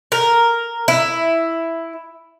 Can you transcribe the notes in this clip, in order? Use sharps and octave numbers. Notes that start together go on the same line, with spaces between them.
A#4
E4